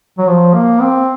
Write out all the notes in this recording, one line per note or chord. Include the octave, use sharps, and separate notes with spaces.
F#3
F3
A#3
C4